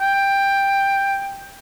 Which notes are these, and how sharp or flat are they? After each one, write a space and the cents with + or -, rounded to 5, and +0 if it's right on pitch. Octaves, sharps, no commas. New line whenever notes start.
G5 +10